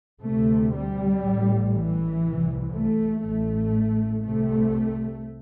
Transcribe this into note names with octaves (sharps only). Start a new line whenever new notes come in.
D2 C3 A3
G3
A1 A2
E3
C2
C3
A3
A1 A2 A3
C2 C3 A3